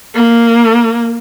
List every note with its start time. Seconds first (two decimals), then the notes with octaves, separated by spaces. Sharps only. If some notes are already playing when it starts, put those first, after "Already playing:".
0.15 A#3